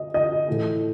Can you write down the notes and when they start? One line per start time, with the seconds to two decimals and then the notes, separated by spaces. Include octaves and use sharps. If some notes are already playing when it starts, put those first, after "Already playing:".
Already playing: D#5
0.14 D#5
0.48 A2 E3 A3